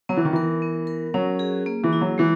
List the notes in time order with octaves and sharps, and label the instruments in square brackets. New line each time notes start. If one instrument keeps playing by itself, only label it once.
[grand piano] F#3 [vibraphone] B3
[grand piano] E3
D#3
[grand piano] E3 [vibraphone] A#4
[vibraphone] B3
A#4
[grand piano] F#3 [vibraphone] C#4
[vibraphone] G#4
A#3
[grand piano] E3
[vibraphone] E4
[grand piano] F#3
[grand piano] E3 [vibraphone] G#3